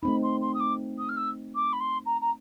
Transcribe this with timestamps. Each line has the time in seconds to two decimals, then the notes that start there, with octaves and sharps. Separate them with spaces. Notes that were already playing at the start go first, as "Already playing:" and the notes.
0.03 A3 C4 D#4 B5
0.23 C6
0.41 C6
0.54 D#6
0.60 D6
0.98 D#6
1.09 F6
1.17 E6
1.55 D6
1.73 B5
1.80 C6
2.06 A#5
2.21 A#5